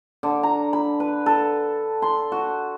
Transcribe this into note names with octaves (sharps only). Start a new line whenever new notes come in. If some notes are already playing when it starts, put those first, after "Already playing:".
D3
A#5
B5
B4
A4
C6
F#4